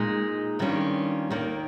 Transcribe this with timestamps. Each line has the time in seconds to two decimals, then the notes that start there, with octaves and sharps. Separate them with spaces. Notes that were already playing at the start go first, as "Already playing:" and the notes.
Already playing: A#2 G#3 D#4
0.59 G2 D#3 G3 C#4 F4
1.30 D#2 D#3 A#3